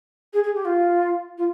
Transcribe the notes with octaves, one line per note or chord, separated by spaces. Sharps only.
G#4
G#4
G4
F4
F4